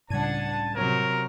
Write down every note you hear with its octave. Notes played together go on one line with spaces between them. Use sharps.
C#2 A2 G3 D4 F#5 A5 G#6 D#7
C3 F#3 A#4